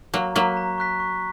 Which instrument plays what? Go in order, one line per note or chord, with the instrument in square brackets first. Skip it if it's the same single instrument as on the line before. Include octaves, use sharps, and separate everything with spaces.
[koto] F#3 A#3 [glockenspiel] A#5
[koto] F#3 A#3 [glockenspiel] C#6 F#6 B6
[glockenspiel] A#5
C#6 F#6 B6
C#6